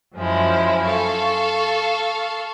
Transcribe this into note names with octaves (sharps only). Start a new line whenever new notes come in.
F#2 F3 G#3 E4
A4 F5 C#6